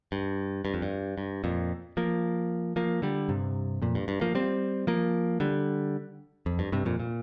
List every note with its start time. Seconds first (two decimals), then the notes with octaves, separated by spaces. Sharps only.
0.12 G2
0.65 G2
0.74 F2
0.82 G2
1.18 G2
1.44 F2 A#2
1.97 F3 A#3
2.76 F3 A#3
3.02 D3 G3
3.29 G2 C3
3.82 F2 A#2
3.95 G2
4.08 G2
4.21 F3 A#3
4.35 G3 C4
4.87 F3 A#3
5.40 D3 G3
6.46 F2
6.59 G2
6.72 G2 C3
6.85 F2 A#2
7.00 A#2